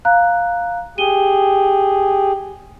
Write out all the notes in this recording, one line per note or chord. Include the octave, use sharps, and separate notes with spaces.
F5 A#5 F#6
G4 G#4 D#7 G7